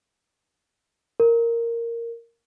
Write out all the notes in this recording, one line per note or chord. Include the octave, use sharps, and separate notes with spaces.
A#4